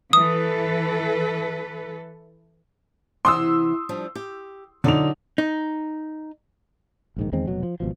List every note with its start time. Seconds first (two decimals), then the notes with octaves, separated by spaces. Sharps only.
0.13 E3 A4 B4 D#6
3.25 C3 E3 F#5 C6 D#6 E6
3.89 F3 G3 D4
4.15 G4
4.84 D3 F#3 D#4 F4 D5 F7
5.38 D#4
7.16 A#1 G#2 D#3
7.32 E2 D#3 G#3 C4
7.47 F1 B2 F#3
7.63 F3
7.80 G#1 B2 F3